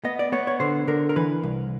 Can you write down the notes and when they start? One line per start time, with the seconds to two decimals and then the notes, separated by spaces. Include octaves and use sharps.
0.04 B3 D#5
0.19 D5
0.32 B3 C#5
0.47 C#5
0.60 D3 C5
0.87 D3 A#4
1.09 A#4
1.16 E3 B4
1.43 C2